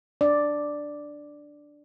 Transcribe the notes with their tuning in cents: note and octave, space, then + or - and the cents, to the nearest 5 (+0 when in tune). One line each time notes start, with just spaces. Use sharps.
D4 +0 D5 +0